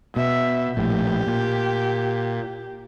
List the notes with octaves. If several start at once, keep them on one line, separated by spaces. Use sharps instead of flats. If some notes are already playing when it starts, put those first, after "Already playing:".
B2 E5
A#1 A2 G4
A#2